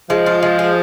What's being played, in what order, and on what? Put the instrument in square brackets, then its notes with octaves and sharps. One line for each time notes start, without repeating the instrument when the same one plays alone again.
[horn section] F3 [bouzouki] G#3
[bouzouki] F4
G#3
G#4